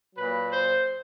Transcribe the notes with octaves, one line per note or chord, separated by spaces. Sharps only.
A#2 F#3 B4
C5